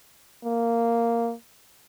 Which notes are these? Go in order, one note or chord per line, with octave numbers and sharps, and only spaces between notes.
A#3